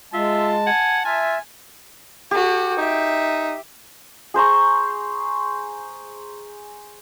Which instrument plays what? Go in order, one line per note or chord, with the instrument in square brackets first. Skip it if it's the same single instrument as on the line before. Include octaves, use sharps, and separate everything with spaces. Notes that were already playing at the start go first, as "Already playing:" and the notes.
[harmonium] G#3 [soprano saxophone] F4 [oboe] E5 [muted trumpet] A5
[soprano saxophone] F#5 [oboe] G#5
[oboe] F4 [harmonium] E5 [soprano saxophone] G#5
[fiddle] F#4 A4 [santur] G4
[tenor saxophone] D#4 [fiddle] E5
[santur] G#4 C5 A#5 C#6